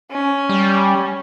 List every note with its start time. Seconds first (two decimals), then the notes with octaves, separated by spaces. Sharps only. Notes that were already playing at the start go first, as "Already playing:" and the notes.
0.11 C#4
0.49 G3